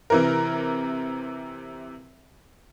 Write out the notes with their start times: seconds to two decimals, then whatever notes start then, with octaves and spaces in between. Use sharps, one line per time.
0.10 C3 E3 A#4